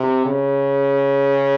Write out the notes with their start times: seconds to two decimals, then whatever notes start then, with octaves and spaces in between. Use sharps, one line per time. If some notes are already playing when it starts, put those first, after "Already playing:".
Already playing: C3
0.25 C#3